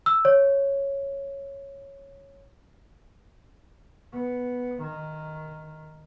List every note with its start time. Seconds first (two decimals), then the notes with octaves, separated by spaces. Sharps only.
0.06 E6
0.25 C#5
4.13 B3
4.82 D#3